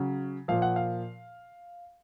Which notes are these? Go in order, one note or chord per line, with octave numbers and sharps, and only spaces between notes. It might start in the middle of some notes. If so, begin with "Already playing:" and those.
Already playing: C#3 F#3
A#2 F3 F5
F#5
F5